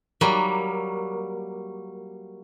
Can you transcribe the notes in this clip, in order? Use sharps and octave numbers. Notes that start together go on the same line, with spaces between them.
F#3 G3 A#3